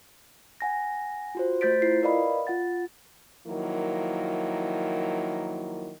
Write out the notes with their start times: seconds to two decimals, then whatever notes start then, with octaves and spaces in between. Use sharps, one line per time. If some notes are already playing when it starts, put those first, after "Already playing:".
0.61 F#5 G#5 A#6
1.35 F4 F#4 C5
1.61 A3 C5 G6 A6 B6 D7
1.82 E4 F4 C7
2.03 A#4 B4 D5 D#5 F5 B5
2.47 F4 F#5 A6
3.47 D#3 F3 F#3 A#3 E4